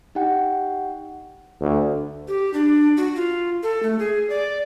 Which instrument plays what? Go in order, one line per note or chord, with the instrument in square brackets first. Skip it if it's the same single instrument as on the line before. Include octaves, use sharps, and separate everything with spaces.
[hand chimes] D#4 G4 F#5 G5
[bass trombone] D2
[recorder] G4
D4
F#4
F4
A4
A3
G#4
D5